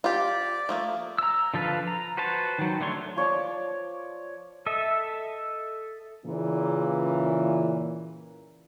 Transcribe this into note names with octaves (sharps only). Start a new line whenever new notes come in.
F4 G4 D5
F3 A3 A#3
A#5 E6
D3 F3 A4 B4 F5
A#5
F#4 B4 C5 A5
D#3 F#3
D3 A3 D4 C#5 C6
F3 C#5 D5 A5
A4 D#5 E5
A#2 C#3 E3